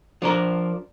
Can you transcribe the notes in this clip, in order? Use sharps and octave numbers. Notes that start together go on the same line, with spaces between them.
F3 D4 A#4